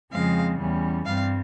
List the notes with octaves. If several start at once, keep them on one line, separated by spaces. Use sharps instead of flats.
F2 C#3 F3 G#3 C4 F5
E2 E3 G3 C#4
G2 G3 C4 F5